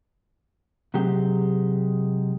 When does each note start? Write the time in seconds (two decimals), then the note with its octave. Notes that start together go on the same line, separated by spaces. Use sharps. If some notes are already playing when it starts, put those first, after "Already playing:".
0.94 C3 F#3 G#3 G4